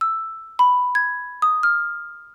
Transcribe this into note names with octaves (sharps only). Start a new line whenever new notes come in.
E6
B5
G#6
D#6
F6